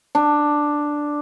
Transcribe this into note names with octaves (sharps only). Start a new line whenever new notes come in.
D4